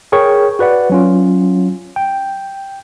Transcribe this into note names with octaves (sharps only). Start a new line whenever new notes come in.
G#4 A#4 C#5 G5 C#6
F#4 B4 D5 F#5
F#3 C#4 F4
G5